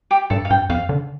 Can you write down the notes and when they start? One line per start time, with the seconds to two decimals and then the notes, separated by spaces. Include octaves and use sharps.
0.11 G4
0.30 G2 A4
0.45 F5
0.50 G2 G5
0.69 F2 F5
0.89 D3